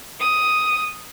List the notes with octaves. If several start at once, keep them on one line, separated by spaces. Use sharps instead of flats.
D#6